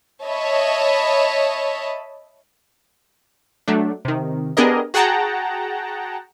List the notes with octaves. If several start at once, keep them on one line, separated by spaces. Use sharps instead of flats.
C#5 D#5 E5 A5 B5
F#3 A3 D4
C3 D#3
B3 D4 G4 G#4 A#4 D#5
F#4 G#4 F#5 G5 A5 A#5